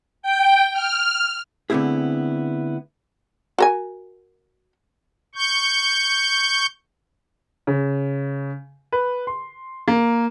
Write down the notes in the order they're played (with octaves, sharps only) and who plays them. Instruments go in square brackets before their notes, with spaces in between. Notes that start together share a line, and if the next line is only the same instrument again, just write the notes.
[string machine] G5
F6
[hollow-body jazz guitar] D3 A3 B3 C4 E4 G#4
[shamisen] F#4 A#4 G#5
[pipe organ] C#6 G6
[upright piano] C#3
B4
C6
A#3